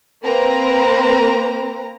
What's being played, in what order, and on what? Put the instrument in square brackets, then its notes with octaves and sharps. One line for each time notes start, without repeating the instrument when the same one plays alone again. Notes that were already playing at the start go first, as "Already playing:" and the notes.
[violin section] A#3 C4 A#4 B4 A#5